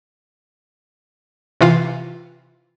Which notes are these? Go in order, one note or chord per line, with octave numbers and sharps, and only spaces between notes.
C3 E3 F4 F5